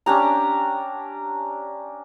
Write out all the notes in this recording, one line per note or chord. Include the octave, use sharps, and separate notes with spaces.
C#4 D4 G4 A#5